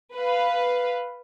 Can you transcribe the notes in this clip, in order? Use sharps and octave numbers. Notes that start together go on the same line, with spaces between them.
B4 F5